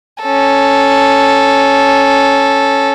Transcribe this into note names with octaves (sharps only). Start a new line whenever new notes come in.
C#4 A4